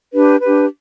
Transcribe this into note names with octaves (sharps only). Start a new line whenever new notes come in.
D4 G4 B4
D4 G4 B4